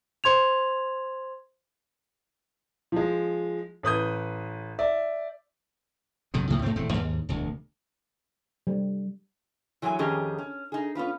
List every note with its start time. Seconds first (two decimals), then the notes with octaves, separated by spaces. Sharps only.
0.24 C5 C6 G#6 F7
2.92 F3 G#3
3.83 A1 B4 D#6 G6
4.79 D5 E5
6.34 B1 F#2 C3 D#3
6.50 C#2 A2 C#3 F3
6.62 G#2 A3 C4
6.76 D#1 E2 A3 C4
6.94 D#2 G#2
7.29 E1 D2
8.67 G3
9.82 E3 F#3 G#3 D4 G#5
9.99 F2 D#3 C#4 G4 G#4 D#5
10.38 C#4
10.72 D#4 G#4
10.95 B3 C#4 F4 B4